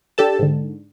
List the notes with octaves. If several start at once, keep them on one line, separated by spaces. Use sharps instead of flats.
D4 G4 A4 A5
G#2 D3